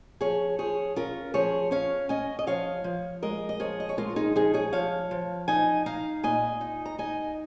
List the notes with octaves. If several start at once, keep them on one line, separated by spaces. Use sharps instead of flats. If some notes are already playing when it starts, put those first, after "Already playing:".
F3 G#4 C#5
F3 G#4 C#5
C#4 F4 A#4
F3 G#4 C#5
C#4 C#5 F5
C#4 D#5 G#5
D#5
F3 C#5 F5
F3
G#3 A#4 D#5
D#5
F3 G#4 C#5
D#5
C#5
G#3 F4 A#4
D#4 G#4
F3 D#4 G#4
G#4 C#5
F3 C#5 F5
F3
D#4 D#5 G#5
D#4 F5 A#5
A#2 D#5 G#5
D#4
A#5
D#4 D#5 G#5